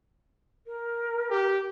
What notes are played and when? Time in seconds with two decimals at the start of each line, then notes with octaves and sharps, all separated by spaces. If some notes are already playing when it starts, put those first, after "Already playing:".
0.66 A#4
1.30 G4